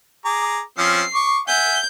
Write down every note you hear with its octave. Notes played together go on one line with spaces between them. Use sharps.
G#4 A#5 D6
F3 C4 C#4 C7
C#6 D6
E5 F#5 G#5 G6